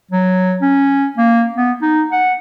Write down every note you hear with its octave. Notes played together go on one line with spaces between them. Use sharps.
F#3
C#4
A#3
B3
D#4
F#5